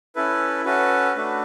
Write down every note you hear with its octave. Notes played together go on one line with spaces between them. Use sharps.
C#4 E4 A4 B4
C#4 F#4 A4 B4
A3 D4 F#4 A4